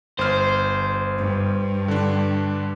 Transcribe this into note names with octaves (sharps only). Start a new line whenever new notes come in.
G1 C5 F6
G2
D3 D4